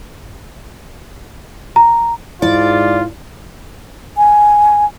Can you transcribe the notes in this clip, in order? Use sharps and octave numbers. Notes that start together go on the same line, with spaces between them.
A#5
G#2 E4 F4 D5
G#5